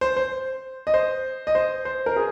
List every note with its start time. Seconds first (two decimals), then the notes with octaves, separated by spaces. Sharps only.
0.01 C5
0.17 C5
0.87 D#5
0.94 C5
1.47 D#5
1.55 C5
1.85 C5
2.06 A#4
2.16 G#4